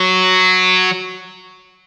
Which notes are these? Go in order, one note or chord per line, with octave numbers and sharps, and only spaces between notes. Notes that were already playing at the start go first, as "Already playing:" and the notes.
Already playing: F#3